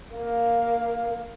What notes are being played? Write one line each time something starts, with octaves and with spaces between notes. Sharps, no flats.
A#3 F5